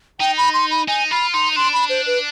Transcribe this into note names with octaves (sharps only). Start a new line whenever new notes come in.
D#4 G5
B5
C6
B5
D#4 G#5
F4 B5
D#4 C6
D4 C6
B5
C5
B4